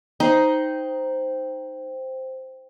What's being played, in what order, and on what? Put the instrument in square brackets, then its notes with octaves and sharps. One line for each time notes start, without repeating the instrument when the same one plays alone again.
[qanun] D#4 [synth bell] C5 G5